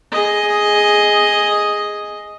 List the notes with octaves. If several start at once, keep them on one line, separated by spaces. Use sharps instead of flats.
G#4 D#5